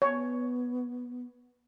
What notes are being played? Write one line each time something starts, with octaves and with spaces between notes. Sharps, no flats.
B3 C#5